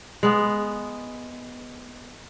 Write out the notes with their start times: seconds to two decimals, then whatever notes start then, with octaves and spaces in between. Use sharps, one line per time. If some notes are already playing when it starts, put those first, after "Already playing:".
0.23 G#3 B3